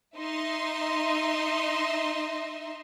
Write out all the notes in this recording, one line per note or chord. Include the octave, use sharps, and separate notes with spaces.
D#4 D#5 E5 C6